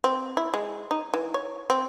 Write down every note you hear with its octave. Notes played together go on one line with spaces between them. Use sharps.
C4
E4
G#3
D#4
E3
C#5
C4